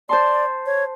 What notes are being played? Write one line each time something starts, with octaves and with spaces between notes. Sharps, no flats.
C5 D5 A5 C6
C#5